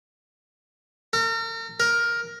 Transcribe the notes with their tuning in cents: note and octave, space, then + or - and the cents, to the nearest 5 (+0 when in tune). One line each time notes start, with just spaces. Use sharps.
A#4 -40
A#4 +10